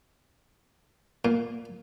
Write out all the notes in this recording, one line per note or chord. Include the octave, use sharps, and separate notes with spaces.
A#2